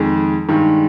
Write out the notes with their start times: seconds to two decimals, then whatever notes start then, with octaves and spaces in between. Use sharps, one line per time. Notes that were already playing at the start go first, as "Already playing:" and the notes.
Already playing: F2 D#3 G#3
0.49 G2 D#3 G#3